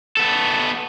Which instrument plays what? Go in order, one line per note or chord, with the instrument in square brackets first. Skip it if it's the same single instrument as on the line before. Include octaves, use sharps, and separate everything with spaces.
[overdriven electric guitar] B3 A4